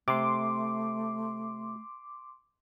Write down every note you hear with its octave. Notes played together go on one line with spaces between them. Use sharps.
C3 A3 C6 D6